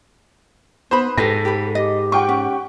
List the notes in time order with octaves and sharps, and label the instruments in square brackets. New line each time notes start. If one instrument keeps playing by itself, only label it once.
[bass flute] B3 [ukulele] D#4 B4 B5 [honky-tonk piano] C5
[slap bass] G#2 [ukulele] G4 B4 G#5 [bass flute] A4 [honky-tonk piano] A#6
[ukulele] G4 B5
[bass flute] G4 [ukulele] D#5
[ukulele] F4 [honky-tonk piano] F#5 G5 C#6
[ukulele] C#4